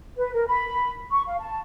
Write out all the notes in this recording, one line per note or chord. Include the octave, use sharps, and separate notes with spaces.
B4
A#4
B5
C#6
F5
A5